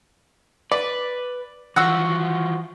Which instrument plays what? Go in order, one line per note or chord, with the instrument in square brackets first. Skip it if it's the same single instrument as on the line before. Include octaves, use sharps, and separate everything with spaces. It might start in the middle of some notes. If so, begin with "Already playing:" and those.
[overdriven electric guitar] B4 [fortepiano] D5
[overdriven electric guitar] E3 F3 [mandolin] F#4 [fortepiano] E6 F#6